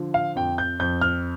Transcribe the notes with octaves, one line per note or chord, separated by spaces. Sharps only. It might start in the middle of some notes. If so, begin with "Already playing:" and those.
Already playing: D3 F3
F5
F2 G5
G6
F2 G6
F6